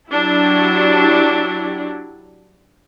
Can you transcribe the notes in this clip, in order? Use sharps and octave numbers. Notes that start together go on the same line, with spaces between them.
F#3 D4 E4 G4